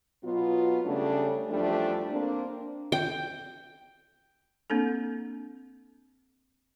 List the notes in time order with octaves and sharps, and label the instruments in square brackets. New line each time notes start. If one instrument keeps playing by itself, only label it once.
[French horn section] B2 F#3 B3 F4
C#3 G3 A3 C#4 D4
E2 F3 G3 A3 D4
A#3 C4 D4
[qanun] G5
[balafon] A#3 C4 D4 A4